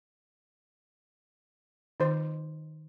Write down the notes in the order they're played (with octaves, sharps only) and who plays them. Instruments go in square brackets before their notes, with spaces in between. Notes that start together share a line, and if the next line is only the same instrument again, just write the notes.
[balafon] D#3 [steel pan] D#4 C5